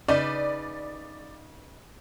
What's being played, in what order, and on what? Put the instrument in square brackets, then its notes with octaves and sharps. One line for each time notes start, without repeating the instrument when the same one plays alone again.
[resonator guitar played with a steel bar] C#3 D#4 B4 [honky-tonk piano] D5